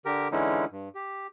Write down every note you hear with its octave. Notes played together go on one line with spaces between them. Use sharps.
D3 G4 A#4
D3 E3 G#3 C#4 D#4 E4
G2
G4